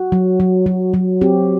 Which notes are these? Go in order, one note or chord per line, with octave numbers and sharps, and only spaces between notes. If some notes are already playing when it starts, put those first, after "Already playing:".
Already playing: F#4
F#3
F#3
F#3
F#3
C4 G4